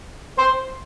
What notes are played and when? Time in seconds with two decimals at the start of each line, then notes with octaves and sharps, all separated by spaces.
0.37 C5